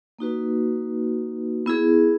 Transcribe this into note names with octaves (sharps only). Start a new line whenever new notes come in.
A#3 D#4 F#4 B4
B3 E4 G#4